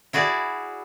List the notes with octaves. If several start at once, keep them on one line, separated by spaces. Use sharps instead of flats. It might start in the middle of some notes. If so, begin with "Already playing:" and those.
E4 F#4 G#4 D5